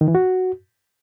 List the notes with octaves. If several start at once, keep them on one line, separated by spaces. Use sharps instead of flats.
D#3
E3
F#4